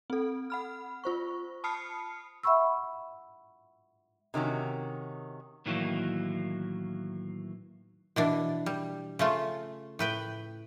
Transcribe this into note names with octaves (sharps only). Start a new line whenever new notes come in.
C4 A4
F#5 B5 F6
F4 C5 C#6
A5 B5 D#6 F6 C7 C#7
E5 F#5 B5 C#6 E6
C3 D#3 C#4 F#4
A2 D#3 E3 F#3 A#3
B2 E3 D4
G3
C#3 A3 F4
A2 B4 G5